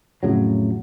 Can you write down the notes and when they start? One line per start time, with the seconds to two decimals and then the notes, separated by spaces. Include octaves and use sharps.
0.23 F2 A2 C#3 F#3